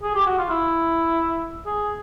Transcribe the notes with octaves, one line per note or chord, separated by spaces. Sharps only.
G#4
G4
F#4
F4
E4
G#4